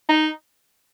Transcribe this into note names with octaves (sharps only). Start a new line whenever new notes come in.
D#4